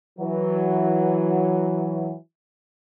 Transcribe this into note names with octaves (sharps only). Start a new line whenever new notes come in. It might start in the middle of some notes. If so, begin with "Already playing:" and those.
E3 F#3